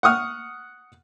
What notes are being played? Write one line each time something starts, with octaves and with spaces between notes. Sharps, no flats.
F#5 C#6 D#6 F6